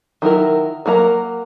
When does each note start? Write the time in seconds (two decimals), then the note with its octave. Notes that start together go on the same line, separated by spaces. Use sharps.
0.22 D#3 F#3 E4 A#4
0.86 F#3 A#3 A#4 A#5